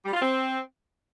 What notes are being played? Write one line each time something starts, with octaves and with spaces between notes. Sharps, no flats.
G3
F4
C4